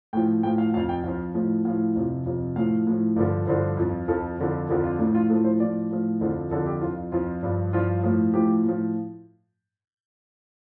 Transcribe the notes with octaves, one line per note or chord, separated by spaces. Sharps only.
A2 F3 G5
A2 F3 G5
F5
F2 F3 F5
G5
F2 F3 F5
A2 F3
A2 F3 F5
F2 C3 F3
F2 C3 F3
A2 F3 F5
A2 F3
G2 D3 F3 D5
G2 D3 F3 C5
F2 F3
F2 F3 A4
F2 D3 F3
F2 D3 F3 G4
F4
A2 F3 D4
F4
A2 F3 A4
C5
A2 F3 D5
A2 F3
F2 D3 F3 C5
F2 D3 F3 A4
G4
F2 F3 F4
F2 F3 F4
G2 F3
G2 F3 F4
A2 F3
A2 F3 G4
A2 F3